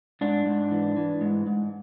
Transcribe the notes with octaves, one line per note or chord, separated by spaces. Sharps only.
G#2 D4
G#2
E3
E3
G#2
G#2